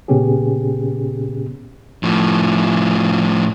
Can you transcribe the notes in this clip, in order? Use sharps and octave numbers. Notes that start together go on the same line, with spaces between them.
A#2 C#3 B3 C#4 G4 G#4
A2 F3